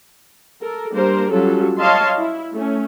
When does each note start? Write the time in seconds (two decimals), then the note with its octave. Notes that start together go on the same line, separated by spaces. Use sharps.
0.60 A4 A#4
0.92 G3 A#3 D4 A#4 C5
1.31 F#3 G3 C#4 F4 A4
1.80 C#5 D#5 F5 A5 C6
2.17 E4
2.53 A3 C#4